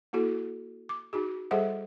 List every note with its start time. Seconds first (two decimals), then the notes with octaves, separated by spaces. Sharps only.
0.13 A#3 E4 F#4 A4
0.89 D6
1.13 D#4 F#4 G#4
1.51 G3 G#4 A4 C5 E5 F#5